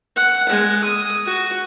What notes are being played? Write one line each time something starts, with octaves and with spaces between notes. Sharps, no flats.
F#5
G#3
D#6
F#4